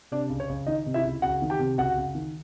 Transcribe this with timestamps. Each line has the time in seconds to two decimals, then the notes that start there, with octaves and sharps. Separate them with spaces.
0.12 C3 D4 D5
0.30 C#2
0.40 C#5
0.49 C#2
0.67 D#3 D#4 D#5
0.86 C3
0.94 E4 E5
1.04 C#2
1.22 C#2 F#4 F#5
1.42 D#3
1.50 G4 G5
1.59 C3
1.78 C#2 F#4 F#5
1.97 C#2
2.15 D#3